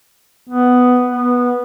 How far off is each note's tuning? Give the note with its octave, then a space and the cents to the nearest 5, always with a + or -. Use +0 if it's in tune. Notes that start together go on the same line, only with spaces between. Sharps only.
B3 +10
B3 -10